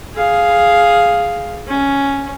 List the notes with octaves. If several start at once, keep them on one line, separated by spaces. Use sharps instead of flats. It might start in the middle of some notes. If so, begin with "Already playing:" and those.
G#4 F5
C#4